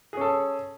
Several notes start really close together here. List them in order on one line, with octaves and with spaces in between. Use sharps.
G#4 C#4 A4